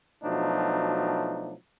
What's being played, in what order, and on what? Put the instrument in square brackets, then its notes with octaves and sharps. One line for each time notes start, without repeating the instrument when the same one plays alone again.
[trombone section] B2 F3 F#3 A3 D4 D#4